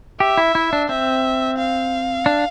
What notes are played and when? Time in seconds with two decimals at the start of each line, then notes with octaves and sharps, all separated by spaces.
0.20 G4 E5
0.38 E4
0.55 E4
0.73 D4
0.89 C4 E5
1.59 F5
2.26 D4